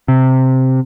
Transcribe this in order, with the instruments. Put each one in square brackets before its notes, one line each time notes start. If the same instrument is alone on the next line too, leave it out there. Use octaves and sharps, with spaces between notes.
[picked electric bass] C3